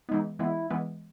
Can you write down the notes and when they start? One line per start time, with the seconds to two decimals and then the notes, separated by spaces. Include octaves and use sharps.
0.09 E3 G#3 B3 D#4
0.39 E3 G#3 B3 E4
0.71 E3 G#3 B3